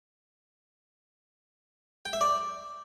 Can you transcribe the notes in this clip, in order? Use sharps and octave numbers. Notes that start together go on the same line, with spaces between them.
G5
E5
D5